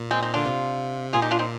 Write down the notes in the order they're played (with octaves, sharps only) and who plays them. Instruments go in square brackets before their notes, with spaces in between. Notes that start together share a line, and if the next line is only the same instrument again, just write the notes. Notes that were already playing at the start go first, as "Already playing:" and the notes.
Already playing: [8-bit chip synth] A#2
[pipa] G#3 C4
C4 D#4
[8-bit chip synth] D3 [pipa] D4 F4
[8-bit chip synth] C3
[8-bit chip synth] A#2 [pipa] F4 G#4
[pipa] D#4 G4
D4 F4
C4 D#4